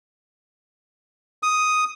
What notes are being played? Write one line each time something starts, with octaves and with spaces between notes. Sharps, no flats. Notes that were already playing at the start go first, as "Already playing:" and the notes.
D#6